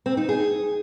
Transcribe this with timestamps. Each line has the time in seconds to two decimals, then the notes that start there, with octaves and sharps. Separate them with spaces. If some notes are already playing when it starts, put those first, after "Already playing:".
0.06 C4
0.17 D#4
0.29 G#4